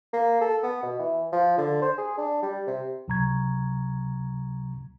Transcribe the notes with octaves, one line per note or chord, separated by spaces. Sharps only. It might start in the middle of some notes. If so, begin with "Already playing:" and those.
A#3
A4
B3
B2
E3
F3
D3
C5
G#4
D4
G3
C3
C#2 C3 F#3 A#5 C#6 G#6